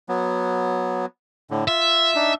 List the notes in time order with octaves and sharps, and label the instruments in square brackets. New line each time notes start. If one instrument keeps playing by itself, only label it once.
[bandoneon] F#3 B3
A2 D3
[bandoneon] F4 [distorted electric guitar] E5
[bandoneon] D4 D#4